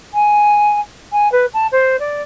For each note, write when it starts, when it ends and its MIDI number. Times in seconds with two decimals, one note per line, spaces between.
0.14 0.80 80
1.12 1.31 80
1.32 1.46 71
1.54 1.67 81
1.72 1.97 72
1.99 2.22 74